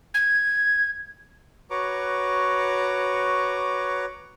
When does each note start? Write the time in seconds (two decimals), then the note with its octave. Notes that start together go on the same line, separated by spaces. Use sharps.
0.14 G#6
1.70 F#4 B4 C#5 A#5 C#6 D6